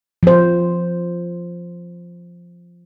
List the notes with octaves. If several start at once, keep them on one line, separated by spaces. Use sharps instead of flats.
F3 C5